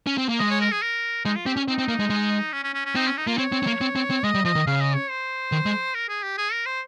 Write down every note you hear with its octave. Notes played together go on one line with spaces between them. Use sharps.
C#4
C4
A#3
G#3 D#5
C#5
A#4
G#4
A#4
G#3 D#4
F4
C4 G4
C#4
C4 D#4
C4
A#3
G#3
G#3
C#4
C#4
C#4
C#4
C4 D#4
C#4
D#4
A#3 F4
C4 C#5
C4
C4
A#3
C4
C4
C4
G#3 D#5
G3
F3 D#5
D#3
C#3 F5
D#5
C#5
C5
D#3
G#3
A#4
G#4
G4
G#4
A#4
C5